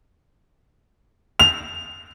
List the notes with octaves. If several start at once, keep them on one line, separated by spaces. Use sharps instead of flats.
F7